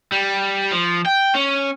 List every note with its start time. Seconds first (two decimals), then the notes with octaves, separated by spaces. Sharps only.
0.12 G3
0.72 F3
1.06 G5
1.35 C#4